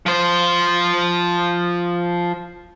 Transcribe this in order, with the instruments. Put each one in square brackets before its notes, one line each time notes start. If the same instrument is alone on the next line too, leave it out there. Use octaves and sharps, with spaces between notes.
[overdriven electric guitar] F3 C5